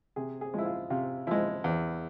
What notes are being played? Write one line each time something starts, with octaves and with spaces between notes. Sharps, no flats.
C3 G#4
G#4
F3 G#3 E4
F4
C3 F4
F3 G#3 E4
E2